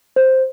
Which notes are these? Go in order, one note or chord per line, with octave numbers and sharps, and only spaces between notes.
C5